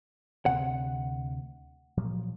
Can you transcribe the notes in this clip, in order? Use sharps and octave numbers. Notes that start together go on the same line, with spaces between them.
D2 C3 C4 F#5
A#2 F3 F#3